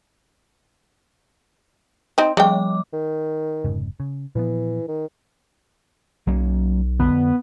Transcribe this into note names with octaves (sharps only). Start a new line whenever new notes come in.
C4 D#4
C#3 F3 G3 G5 D6
D#3
F1 G#2 C#3
C#3
A#2 E3 F3 B3
D#3
B1 F#3 A#3 C#4
F2 D3 B3